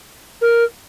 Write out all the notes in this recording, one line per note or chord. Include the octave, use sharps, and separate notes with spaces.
A#4